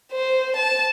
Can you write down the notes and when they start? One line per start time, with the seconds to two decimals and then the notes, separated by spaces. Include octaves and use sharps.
0.13 C5
0.56 A5